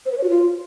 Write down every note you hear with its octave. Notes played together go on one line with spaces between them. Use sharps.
C5
B4
C#5
F#4
F4